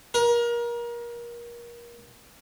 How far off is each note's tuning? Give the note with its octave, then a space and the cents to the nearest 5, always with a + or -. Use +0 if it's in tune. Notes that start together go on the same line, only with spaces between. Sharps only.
A#4 +30